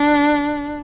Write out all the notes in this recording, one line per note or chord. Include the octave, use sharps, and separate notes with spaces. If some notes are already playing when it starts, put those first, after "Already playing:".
Already playing: D4